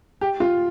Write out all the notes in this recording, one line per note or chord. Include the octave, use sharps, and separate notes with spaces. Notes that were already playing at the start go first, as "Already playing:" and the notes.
G4
F4